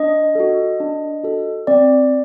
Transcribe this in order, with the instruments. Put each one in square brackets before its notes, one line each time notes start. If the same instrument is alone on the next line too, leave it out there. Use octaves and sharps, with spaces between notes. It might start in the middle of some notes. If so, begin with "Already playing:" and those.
Already playing: [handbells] D4 D#5
F#4 A4
D4
F#4 A4
C4 D5